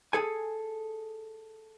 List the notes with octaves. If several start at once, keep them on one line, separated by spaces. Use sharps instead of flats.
G#4 A4 G#5